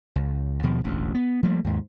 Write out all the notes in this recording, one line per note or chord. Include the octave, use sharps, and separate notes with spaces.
C#2
D#2 B2 F3
E1 A1 D2
B3
F3 G3 A3 A#3
D#2 G#2